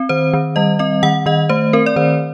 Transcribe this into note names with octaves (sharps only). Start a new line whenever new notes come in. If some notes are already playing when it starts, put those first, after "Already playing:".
Already playing: C4
D#3 C5
D#3
G3 D#5
C4 D#5
D#3 F#5
D#3 D#5
A3 C5
C4 A#4
D5
D#3 C5